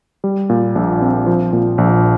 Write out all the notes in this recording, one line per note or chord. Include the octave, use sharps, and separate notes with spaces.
G3
A#2
A#1
C4
F3
A#2
A#1